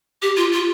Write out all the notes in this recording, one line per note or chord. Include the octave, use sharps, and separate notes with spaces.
G4
F4
F4